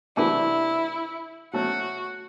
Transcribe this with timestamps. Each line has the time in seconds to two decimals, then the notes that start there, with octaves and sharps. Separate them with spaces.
0.17 C3 E3 A3 D4 E4 F#4
1.53 F#3 A3 C#4 F#4